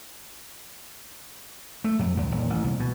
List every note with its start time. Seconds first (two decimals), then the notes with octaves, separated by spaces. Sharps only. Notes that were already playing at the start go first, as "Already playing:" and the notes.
1.84 A3
1.99 F2
2.17 D#2
2.31 D#1
2.50 A1
2.64 C2
2.80 B2